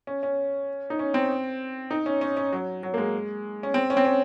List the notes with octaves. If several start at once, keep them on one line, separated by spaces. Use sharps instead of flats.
C#4
C#4
D#4
C#4
C4
D#4
C#4
C#4
C#4
F#3
F#3
A#3
G#3
C#4
C4
C#4
C4
C#4